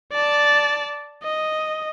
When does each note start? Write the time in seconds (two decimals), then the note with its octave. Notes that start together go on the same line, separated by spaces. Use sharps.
0.12 D5 A5
1.23 D#5